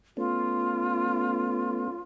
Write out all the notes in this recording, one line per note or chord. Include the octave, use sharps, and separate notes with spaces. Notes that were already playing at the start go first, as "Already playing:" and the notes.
A3 B3 C#4 F4